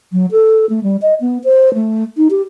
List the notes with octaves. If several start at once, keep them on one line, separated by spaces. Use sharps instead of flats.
F#3
A4
A3
G3
D#5
B3
C5
A3
D#4
G4